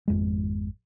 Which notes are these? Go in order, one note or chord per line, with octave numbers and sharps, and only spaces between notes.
G#1 F2 G#3